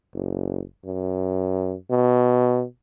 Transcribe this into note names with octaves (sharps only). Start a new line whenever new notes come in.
F#1
F#2
B2